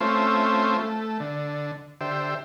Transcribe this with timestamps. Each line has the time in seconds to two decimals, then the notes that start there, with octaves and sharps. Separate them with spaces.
0.01 A3 C4 C#4 F4 C5 E5
0.79 A3
1.20 D3
2.01 D3 G4 C5 E5